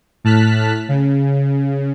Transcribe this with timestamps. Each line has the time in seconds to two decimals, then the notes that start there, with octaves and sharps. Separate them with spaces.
0.24 A2 A5 F6 F#6 B6
0.89 C#3